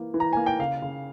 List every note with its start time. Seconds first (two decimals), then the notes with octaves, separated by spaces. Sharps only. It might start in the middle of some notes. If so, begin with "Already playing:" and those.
Already playing: E3 A#3
0.14 E3
0.20 A#5
0.33 A#3 G#5
0.46 G5
0.60 C#3 F5
0.82 C#3